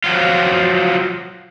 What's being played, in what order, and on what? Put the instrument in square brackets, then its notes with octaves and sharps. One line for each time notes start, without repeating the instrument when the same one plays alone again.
[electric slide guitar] F3 F#3 F4